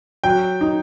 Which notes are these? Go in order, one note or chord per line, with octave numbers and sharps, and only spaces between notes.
F#3 G5
D#4